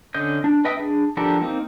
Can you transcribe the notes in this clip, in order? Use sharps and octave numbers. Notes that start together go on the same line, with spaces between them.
D3 C#4 D#5 G6
D4
B4 D#5 E5 G5 D#6
D4 G#4
F3 D4 G4 A4 A#4
A#3 C4 D#4